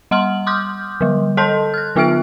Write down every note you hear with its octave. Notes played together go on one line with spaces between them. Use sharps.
G3 F#5 C6 F6 F#7
C6 D6 D#6 F6 G6
D3 G3
A4 D#5 A5 C6 G6
F6 F#6
D3 B3 F4 E5 F6 D7